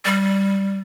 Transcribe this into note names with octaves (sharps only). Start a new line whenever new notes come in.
G3